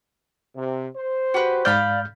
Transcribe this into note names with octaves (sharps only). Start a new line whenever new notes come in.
C3
C5
F#4 G4 B4
G#2 D5 F5 B5 F6 G6